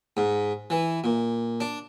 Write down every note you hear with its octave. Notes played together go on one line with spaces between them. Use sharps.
G#2
E3
A#2
D4